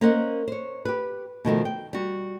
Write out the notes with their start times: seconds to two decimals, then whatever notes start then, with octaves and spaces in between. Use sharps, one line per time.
0.01 A#3 C#4 A#4 C5 D#5 F#5
0.48 C5 C#5
0.85 G4 B4
1.45 B2 D#3 F3 A3
1.65 G5
1.93 G3 F#4